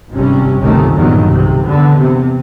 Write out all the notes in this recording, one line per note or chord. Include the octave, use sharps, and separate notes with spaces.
G#1 G2 C3 G3 C#4
G1 C#2 C3 D#3 A3 C#4
E2 G2 A#2 D#3 F#3
B1 C3
E2 D3 B3
C3